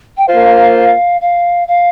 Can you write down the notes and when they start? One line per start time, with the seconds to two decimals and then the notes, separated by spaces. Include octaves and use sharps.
0.17 G5
0.28 A#3 F4 C5 F5
0.75 F5
1.21 F5
1.68 F5